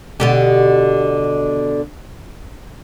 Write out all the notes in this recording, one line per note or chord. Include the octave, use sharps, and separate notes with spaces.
B2 D3 G4